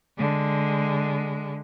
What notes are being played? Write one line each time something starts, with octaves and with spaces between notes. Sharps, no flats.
D3 G#3